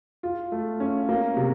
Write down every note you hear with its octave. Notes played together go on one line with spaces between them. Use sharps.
F4
A3
C#4
A#3
C3